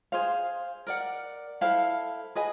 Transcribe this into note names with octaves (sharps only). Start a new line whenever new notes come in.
G#4 C5 F5
A#4 D5 F#5
E4 A4 C5 F5
G#4 B4 D#5 G#5